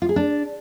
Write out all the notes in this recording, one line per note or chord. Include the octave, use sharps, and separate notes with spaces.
F4
G#4
D4